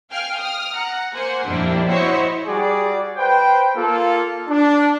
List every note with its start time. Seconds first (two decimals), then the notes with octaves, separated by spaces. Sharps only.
0.11 F5 G5 G#5 F6
0.39 D#6 F6
0.75 F#5 A#5
1.15 A#3 C5 F#5 G#5
1.46 F2 A#2 G3 A#3 D4 E4
1.89 E4 F#4 C5 C#5 D#5 C#6
2.47 G3 F#4 G#4 D5
3.16 B4 C5 G5
3.76 A#3 F4 A4
4.50 D4